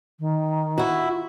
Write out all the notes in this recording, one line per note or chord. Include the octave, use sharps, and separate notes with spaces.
D#3
E4 F#4
F4